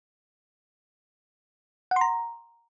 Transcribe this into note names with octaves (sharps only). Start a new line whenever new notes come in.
F#5
C6
A#5